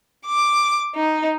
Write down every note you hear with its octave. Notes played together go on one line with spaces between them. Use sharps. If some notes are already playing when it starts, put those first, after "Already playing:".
D6
D#4